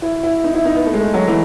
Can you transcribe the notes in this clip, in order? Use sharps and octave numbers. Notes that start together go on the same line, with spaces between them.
E4
E4
D#4
E4
D#4
B3
A3
G#3
A3
F#3
E3